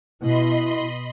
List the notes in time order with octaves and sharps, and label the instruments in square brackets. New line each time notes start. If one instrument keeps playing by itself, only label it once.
[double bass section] B2 [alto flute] E4 [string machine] D#5 B5 C6